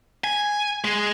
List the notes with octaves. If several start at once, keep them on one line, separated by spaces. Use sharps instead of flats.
G#5
G#3